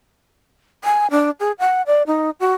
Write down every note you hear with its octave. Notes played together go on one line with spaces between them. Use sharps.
G#5
D4
G#4
F#5
D5
D#4
F#4